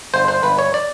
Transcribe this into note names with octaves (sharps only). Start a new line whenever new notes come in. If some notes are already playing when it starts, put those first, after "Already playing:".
G1 C5
C5
G1 B4
C#5
D5